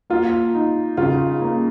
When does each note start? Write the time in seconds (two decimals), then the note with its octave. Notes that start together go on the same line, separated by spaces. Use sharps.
0.10 A#3 F4
0.54 D#4
0.97 C#3 F4
1.41 A#3